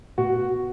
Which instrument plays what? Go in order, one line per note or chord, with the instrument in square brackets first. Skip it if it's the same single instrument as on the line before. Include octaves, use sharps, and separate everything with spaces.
[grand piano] B2 F#4